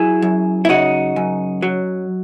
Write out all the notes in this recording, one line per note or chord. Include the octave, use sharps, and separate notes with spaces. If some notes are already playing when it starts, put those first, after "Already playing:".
Already playing: F#3 E4 G#4
F#2
E4
C#3 D#4 F#4
F#2
F#3